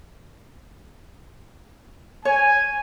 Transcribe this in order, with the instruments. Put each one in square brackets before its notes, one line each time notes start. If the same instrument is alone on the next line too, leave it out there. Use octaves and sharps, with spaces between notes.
[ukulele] C#5 [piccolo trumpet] G#5